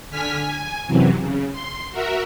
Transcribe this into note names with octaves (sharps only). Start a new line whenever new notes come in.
D3 G#5 F6 B6
G#5
F#2 C3 E3 F#3
C#3
C6
F#4 A#4 E5